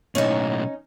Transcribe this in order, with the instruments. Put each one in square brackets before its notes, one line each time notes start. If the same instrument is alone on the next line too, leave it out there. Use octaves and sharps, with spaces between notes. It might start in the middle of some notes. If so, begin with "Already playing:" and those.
[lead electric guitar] B1 A2 [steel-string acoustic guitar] C#4 D#4